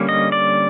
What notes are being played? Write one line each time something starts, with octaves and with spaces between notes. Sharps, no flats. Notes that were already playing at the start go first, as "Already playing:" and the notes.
Already playing: D3 G3 A#3 C#4
D#5
D5